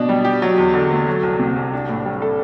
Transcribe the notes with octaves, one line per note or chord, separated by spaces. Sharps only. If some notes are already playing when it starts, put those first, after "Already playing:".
Already playing: B2 D4
G3
G4
F#3
E2
D3
A3
F#3
C2
C3
C2
D4
A2
G3
A4